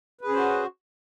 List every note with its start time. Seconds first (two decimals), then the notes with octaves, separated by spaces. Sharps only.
0.21 B4
0.25 G#4
0.29 C#4
0.32 C5
0.36 F#4